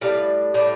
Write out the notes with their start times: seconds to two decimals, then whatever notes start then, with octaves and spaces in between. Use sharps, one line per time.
0.01 A2 G3 D4 F5
0.54 A2 G3 D4